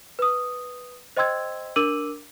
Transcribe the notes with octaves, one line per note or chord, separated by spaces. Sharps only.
B4 D#6
C5 D#5 G5 C6 E6 G#6
D4 A#4 D6 E6 D#7 F#7